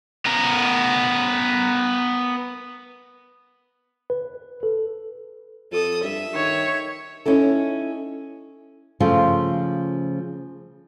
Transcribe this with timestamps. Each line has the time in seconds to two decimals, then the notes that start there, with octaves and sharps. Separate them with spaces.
0.26 B3 A#4
4.10 B4
4.63 A4
5.72 F2 A4 D#6
6.03 G2 E5
6.35 D#3 C#5
7.26 C#4 D#4 E4 A4
9.00 C#3 F3 A3 F4